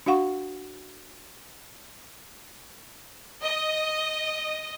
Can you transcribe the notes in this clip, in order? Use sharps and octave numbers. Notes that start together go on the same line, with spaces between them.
D4 F#4 F5 F#5 C#6
D#5